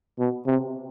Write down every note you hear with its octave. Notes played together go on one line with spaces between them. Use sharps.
B2
C3